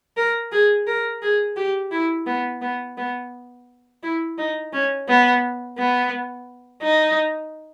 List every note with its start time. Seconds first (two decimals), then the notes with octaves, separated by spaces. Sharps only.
0.17 A#4
0.52 G#4
0.87 A#4
1.22 G#4
1.57 G4
1.92 E4
2.27 B3
2.62 B3
2.97 B3
4.03 E4
4.38 D#4
4.73 C#4
5.08 B3
5.78 B3
6.83 D#4